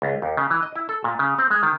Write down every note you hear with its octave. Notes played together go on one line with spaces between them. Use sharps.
C#2
D#2
C#3
E3
D#5
E4
A4
A#2
C#3
C4
G#3
D#3